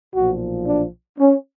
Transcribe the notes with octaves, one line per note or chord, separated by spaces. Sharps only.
B1 A#2 F3 F#4
D4
C#4